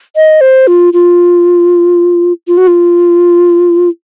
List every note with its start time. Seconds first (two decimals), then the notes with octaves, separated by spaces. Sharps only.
0.16 D#5
0.41 C5
0.67 F4
0.93 F4
2.48 F4
2.57 F#4
2.67 F4